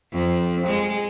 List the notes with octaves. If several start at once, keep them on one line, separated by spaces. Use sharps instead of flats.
F2
G#3